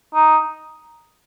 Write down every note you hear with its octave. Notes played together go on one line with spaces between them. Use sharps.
D#4